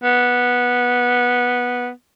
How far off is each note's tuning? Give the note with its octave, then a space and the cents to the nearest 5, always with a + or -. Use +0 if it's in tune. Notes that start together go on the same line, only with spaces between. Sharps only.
B3 -10